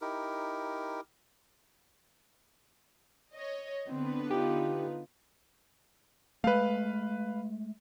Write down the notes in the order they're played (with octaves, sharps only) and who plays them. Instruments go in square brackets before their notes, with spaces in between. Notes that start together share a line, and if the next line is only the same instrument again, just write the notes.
[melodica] D#4 E4 G4 A#4
[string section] C#5 D#5
[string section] D3 B3 B4 [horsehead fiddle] C4
[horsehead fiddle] D#4 F4 [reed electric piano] G4
[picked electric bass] G#3 A3 [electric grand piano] B4 F5